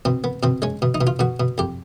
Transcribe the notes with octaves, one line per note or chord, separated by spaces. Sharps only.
B2 C4
B3
B2 C4
G#3 C#4
B2
D#4
B2
F4
B2 F#4
B2
F2 G4